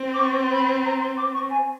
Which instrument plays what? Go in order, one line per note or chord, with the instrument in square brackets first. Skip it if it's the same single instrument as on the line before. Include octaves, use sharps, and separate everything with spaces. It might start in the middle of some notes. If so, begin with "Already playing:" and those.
Already playing: [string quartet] C4
[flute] D6
C#6
C6
B5
A#5
C6
D6
C#6
G#5